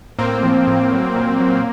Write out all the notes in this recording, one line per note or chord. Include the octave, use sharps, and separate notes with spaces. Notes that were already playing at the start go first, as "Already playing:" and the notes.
A2 A#3 C4
F3
A2
F#3
A#2
F#3